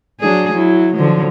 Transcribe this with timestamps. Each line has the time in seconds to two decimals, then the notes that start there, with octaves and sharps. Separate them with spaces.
0.20 F#3 D4 G#4
0.52 F#3 E4
0.94 D3 F3 F#3